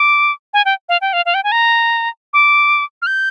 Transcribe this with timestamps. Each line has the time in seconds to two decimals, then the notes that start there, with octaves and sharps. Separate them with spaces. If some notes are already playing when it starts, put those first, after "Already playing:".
Already playing: D6
0.54 G#5
0.65 G5
0.89 F5
1.01 G5
1.13 F5
1.26 F5
1.34 G5
1.44 G#5
1.52 A#5
2.33 D6
3.02 F6
3.07 G6